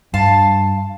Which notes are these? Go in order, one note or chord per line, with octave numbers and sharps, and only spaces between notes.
G2 F5 A5 C6